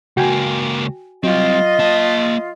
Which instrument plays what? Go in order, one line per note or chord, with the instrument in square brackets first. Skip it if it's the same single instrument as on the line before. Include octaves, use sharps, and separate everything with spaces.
[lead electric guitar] C#2 A#3 [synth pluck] F#4 G5 G#5
[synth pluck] F#3 [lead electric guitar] G3 C4 [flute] F4 [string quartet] D#5
[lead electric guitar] A#3 A5